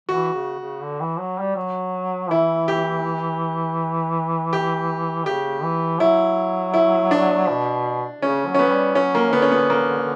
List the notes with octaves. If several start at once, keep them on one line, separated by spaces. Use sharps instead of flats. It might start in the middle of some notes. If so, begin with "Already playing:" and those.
E3 F#4
C#3
C#3
D3
E3
F#3
G3
F#3
E3 E4
G4
G4
C#3 G4
E3
F#3 E4
E4
D4
B2
C#3 C#4
F#3
C#4
B3
F#3
G3
F#3 C#4
A#3
D3 B3
C#4
B3
A#3